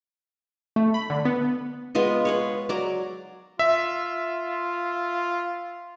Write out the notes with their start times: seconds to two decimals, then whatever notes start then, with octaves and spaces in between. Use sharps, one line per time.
0.76 A3
0.94 B5
1.10 D3
1.25 B3
1.95 G#3 B3 F4 D#5
2.25 G#4 B4 C#5
2.69 F#3 D5 A#5 D6
3.59 F4 E5